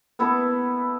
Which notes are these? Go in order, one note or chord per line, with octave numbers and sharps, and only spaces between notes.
B3 E4 A4 B4